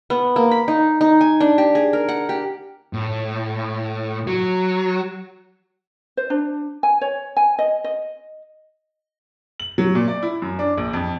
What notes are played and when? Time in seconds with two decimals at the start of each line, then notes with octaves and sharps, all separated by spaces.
0.10 B3
0.36 A#3
0.51 B5
0.68 D#4
1.01 D#4
1.21 G#5
1.40 D4
1.58 G4
1.75 G#4
1.93 A#4
2.09 F#5
2.29 G4
2.93 A2
4.27 F#3
6.17 C5
6.30 D4
6.83 G#5
7.01 C#5
7.37 G#5
7.59 D#5
7.84 D#5
9.60 F#7
9.78 F#3
9.95 A#2
10.08 D5
10.23 E4
10.42 F#2
10.59 D4
10.78 A#1
10.94 F2